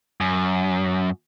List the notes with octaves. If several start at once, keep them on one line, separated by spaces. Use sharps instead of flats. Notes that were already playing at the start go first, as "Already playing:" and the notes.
F#2